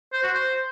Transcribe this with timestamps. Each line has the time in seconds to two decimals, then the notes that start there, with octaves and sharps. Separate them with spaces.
0.13 C5
0.23 F#4
0.33 C5